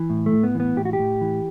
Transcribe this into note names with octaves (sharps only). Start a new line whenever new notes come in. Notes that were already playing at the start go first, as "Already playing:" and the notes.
Already playing: E3
A2
A3
A2
B3
E3 B3
A2 G4
F#4
G4
A2
E3